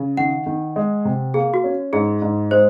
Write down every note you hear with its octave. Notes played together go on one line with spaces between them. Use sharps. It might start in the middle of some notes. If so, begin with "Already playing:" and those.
Already playing: C#3
D#3 F#5
D#3
G#3
C3
A#3 G#4
F#4
C#4
G#2 G#4
G#2
G#3 C5